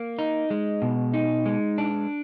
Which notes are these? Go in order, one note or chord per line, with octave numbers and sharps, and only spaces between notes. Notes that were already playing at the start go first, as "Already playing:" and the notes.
Already playing: A#3
D#4
G#3
B2
D#4
G#3
D4